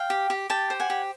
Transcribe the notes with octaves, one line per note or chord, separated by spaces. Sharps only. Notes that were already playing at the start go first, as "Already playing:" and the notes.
Already playing: F5 G5
G4
G4
G4 G5 A5
C5
F#5 G#5
G4